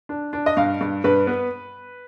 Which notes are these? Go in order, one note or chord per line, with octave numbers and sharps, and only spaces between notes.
D4
D4
D#5
G2 F5
G2
G2 B4
B3